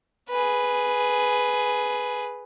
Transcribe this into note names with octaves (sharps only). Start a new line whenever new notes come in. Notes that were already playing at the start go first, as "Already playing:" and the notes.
G#4 B4